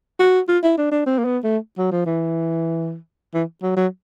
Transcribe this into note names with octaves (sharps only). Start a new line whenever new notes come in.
F#4
F4
E4
D4
D4
C4
A#3
B3
A3
F#3
F3
E3
E3
F#3
F#3